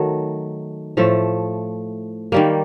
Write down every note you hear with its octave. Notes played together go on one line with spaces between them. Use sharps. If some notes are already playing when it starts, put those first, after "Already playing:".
Already playing: D#3 F#3 A3
A2 F3 A3
D#3 G3 A#3